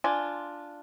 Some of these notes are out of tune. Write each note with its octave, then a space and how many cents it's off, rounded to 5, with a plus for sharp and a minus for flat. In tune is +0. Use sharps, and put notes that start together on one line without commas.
D4 +0 F4 -5 G#5 +0